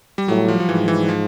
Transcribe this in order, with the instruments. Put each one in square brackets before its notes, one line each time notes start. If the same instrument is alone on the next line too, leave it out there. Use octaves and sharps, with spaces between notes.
[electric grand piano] G3
[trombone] A2 [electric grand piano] F#3
[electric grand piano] F3
F3
[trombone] G#2 [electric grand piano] E3
[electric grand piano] E3
F3